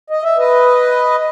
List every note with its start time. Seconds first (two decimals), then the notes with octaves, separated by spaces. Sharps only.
0.10 D#5
0.23 E5
0.37 B4 D#5